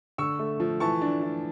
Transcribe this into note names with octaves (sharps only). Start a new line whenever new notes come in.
D3 C#6 E6
A3
F3
E3 A5 C#6
D4
E3